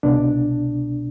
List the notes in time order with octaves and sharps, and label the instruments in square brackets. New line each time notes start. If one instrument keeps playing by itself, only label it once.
[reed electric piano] C2 B2 D4